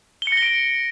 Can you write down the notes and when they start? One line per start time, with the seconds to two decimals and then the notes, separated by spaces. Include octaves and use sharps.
0.22 G7
0.27 C#7
0.32 A#6
0.37 G7
0.42 D7